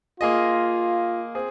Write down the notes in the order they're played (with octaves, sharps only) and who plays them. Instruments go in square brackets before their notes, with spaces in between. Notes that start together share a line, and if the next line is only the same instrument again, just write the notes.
[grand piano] A#3 G#4 D#5 [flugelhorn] F4
[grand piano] C4 G#4